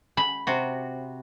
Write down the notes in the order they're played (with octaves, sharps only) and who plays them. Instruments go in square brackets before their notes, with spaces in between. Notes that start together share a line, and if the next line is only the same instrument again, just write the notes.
[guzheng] B5
[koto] C3 F#4